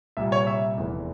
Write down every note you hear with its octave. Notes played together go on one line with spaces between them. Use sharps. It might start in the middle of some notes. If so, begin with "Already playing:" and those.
C2 A#2 G3 E5
C#5
E5
F1 E2 E3